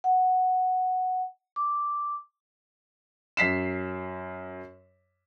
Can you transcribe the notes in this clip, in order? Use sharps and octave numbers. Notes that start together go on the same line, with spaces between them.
F#5
D6
F#2 B6 C7 E7